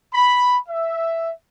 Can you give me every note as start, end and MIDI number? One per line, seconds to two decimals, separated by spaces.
0.14 0.57 83
0.69 1.31 76